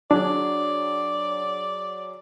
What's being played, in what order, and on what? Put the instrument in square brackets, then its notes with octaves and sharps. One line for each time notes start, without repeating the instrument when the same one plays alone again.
[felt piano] F#3 G#4 [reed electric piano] D4 [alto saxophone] D5